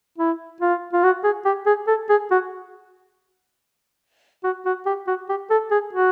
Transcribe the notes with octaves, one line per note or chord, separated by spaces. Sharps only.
E4
F4
F4
F#4
G#4
G4
G#4
A4
G#4
F#4
F#4
F#4
G4
F#4
G4
A4
G#4
F#4